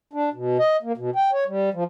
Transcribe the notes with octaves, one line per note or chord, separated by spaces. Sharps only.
D4
B2
D#5
A#3
B2
G5
C#5
G3
F3